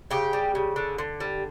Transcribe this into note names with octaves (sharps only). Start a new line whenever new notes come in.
C#3 G4
G3
C#3
D3
D3
G3